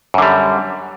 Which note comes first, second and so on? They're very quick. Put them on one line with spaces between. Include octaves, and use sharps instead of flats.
F#2 D3 G3